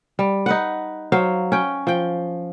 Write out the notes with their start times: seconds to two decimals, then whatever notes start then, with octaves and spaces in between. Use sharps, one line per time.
0.19 G3
0.46 D#4 B4 F#5
1.12 F#3 C5 F5
1.52 C#4 G5
1.87 F3 G5